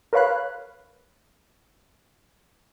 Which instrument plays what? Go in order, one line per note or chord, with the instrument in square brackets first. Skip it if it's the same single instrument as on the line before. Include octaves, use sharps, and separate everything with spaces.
[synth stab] A#4 B4 C#5 F5 B5 F#6